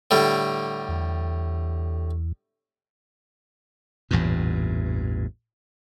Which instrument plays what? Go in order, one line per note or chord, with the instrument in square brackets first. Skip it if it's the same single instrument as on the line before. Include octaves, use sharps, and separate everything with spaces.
[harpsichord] A2 D3 G3
[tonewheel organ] E2
[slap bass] A1 E2 G2 A#2